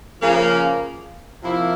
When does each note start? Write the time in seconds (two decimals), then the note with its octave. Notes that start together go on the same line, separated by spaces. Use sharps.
0.21 C#3 F3 A#3
1.41 C3 F3 A#3 E4